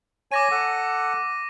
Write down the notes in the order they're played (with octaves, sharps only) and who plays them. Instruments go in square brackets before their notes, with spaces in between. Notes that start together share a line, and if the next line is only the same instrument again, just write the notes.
[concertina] C#5 G#5 [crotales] D6 A#6 D#7
[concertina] A4 F#5